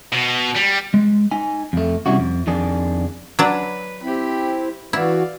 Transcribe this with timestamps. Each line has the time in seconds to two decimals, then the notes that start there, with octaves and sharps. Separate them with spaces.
0.12 B2
0.56 G3
0.94 G#3
1.31 D#4 G#5
1.73 F2 A3
2.06 C3 G3 C#4 E4 F#4
2.18 F2
2.47 F2 D#3 D4 G#4
3.39 F#3 D4 B4
4.03 C4 E4 G4 B5
4.93 E3 E4 F#4 D5 F5